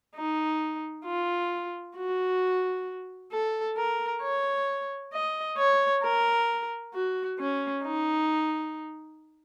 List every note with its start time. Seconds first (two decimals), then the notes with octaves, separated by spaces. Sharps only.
0.16 D#4
1.05 F4
1.97 F#4
3.32 A4
3.77 A#4
4.22 C#5
5.13 D#5
5.58 C#5
6.03 A#4
6.94 F#4
7.39 C#4
7.83 D#4